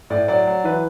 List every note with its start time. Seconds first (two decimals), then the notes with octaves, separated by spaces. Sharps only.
0.10 A2 D5
0.28 F#3 D5
0.47 F#3
0.64 E3 B4